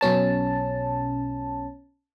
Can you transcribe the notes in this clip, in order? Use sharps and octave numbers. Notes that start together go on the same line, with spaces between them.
B1 B2 C#4 A5